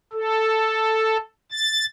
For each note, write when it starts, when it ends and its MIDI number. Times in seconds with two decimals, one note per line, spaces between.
0.13 1.17 69
1.52 1.85 93